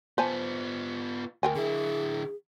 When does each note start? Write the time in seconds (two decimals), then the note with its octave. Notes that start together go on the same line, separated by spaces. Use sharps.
0.18 B3 F4 C5 G#5 A5
1.43 D2 A#4 G5 G#5
1.55 D3 E4 G#4